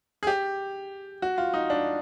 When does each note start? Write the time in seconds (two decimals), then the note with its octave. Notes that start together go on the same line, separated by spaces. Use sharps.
0.23 G#4
0.27 G4
1.22 F#4
1.38 F4
1.54 D#4
1.70 D4